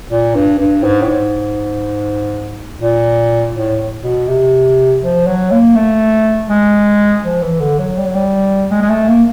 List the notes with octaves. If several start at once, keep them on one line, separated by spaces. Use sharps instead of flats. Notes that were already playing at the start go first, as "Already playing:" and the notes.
A#2
G2
G2
G#2
A2
G#2
A#2
A2
B2
C3
F3
F#3
A#3
A3
G#3
F3
E3
D3
F#3
G3
F#3
G3
G#3
G#3
A3
A#3